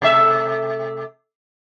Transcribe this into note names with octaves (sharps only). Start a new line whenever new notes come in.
C3 A3 E5